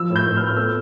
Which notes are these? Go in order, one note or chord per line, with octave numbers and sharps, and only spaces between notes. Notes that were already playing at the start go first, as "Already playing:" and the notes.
Already playing: F3 E6
A2
G6
A2
F6
B3
F6
A3 E6